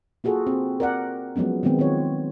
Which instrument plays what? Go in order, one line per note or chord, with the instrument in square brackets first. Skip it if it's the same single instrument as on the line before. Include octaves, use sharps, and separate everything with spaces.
[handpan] A#3 F4 F#4 G#4 A4
C4
A#4 D5 F#5
F3 F#3 G#3 B3 C#4
D#3 F#3 G#3 B3 C4
D#3 C4 F4 C#5